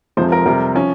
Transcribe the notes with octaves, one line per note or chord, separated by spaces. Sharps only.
F1 F2 C3 F3 G#3 C5
A#4
F2 C3 G3 A#4
F3 C#4